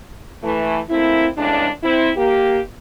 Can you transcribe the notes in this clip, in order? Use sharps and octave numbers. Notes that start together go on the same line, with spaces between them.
E3 A3
A3 A#3 C4 E4
E2 A2 C#3 G#3 D4
C4 E4
A#3 G4